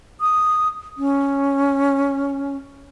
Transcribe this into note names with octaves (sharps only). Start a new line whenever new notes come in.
D#6
C#4